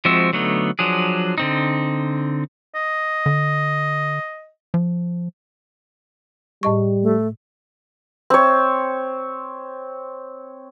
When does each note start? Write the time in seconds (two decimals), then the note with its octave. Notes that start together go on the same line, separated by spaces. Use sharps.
0.05 F3 G#3 C4 F#4 E5
0.33 D3 F#3 A3 B3 D#4
0.79 F3 F#3 D4 G#4
1.38 D3 C4 D#4
2.75 D#5
3.26 D3
4.74 F3
6.63 A2 G3 D#5 C#6
7.03 A3
8.30 C4 C#5